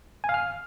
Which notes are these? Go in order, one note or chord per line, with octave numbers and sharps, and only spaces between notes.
G#5
F5
F6